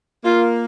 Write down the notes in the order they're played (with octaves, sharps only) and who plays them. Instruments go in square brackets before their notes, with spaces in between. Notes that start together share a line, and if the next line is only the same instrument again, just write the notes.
[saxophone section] A#3 [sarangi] F4